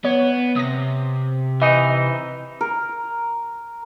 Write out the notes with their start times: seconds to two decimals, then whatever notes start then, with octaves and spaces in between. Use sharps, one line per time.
0.05 B3 C#5
0.56 C3 D#6 A#6
1.62 E3 D#4 D#5
2.61 A#4